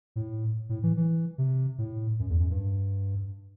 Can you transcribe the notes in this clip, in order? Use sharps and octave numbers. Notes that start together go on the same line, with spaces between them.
A2
A2
E3
E3
C3
A2
F#2
E2
F#2
G2